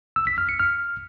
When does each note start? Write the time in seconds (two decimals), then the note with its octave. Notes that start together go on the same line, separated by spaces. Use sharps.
0.16 E6
0.27 B6
0.38 F6
0.49 C#7
0.60 F6